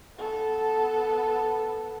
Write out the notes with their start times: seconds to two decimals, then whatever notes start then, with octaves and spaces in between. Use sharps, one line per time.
0.17 B3 A4